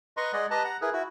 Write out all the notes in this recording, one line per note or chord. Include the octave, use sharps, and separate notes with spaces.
B4 D#5 A#5 C6 C#6
G#3 G#4 D5 D#5 F#5
G4 B4 D#5 A5 A#5
F#5 A#5
E4 G#4 A#4 B4
E4 F#4